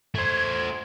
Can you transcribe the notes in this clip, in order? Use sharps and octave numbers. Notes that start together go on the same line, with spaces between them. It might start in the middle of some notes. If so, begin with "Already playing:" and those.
A3 C5 G#6